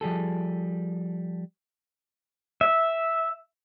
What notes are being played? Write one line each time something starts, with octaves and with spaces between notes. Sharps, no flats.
F3 G3 G#4 A4
E5